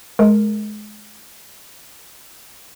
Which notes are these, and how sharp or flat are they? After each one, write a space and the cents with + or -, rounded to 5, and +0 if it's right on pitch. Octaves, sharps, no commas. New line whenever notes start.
G#3 +30 A#4 +0